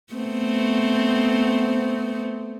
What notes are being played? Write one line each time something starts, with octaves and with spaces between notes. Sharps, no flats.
A3 B3 C4